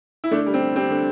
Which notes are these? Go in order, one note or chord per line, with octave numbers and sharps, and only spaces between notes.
E4
D3 A3 D4
G3
C4
G3
G3 C4
D3